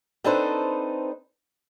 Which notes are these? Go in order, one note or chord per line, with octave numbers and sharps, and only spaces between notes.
C4 D4 D#4 A4 B4 C5